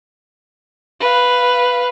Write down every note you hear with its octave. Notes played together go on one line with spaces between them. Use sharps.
B4 F5